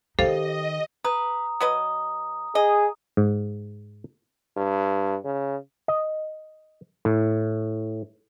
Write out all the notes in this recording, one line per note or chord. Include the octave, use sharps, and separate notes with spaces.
D#3 D#4 G4 A4 C5 D#5 F5
B4 A#5 D#6
F#3 B4 D#5 D#6
G#4 D#5
G#2
G2
C#3
D#5
A2